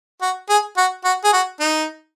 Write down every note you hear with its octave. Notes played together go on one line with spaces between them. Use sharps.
F#4
G#4
F#4
F#4
G#4
F#4
D#4